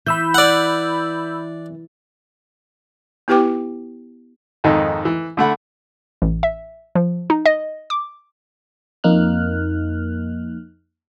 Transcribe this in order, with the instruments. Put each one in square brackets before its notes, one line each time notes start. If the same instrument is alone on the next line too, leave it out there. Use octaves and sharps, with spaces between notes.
[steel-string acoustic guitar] E3 [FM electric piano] B5 E6 G6
[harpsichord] D5 F#5
[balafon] B3 E4 G4 B4 G5 D6
[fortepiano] F2 G#2 D#3 A4 D#5
E3
D3 A3 F#5 B5
[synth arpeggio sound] A1
E5
F3
D#4
D#5
D6
[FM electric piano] F2 A#3 D#4 F6 F#6